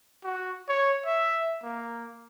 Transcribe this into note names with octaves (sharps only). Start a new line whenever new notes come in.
F#4
C#5
E5
A#3